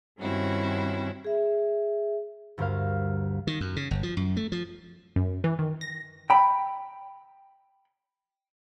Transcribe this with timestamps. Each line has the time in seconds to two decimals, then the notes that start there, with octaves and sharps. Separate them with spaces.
0.19 G2 D#3 C4 C#4 E4 F#4
1.25 G#4 E5
2.58 D2 G2 A#4 C5 F5
3.47 D#3
3.61 F#2
3.76 C#3
3.91 G1
4.03 F3
4.17 F#2
4.37 A3
4.52 F3
5.16 F#2
5.44 E3
5.59 D#3
5.81 A#6
6.30 G5 B5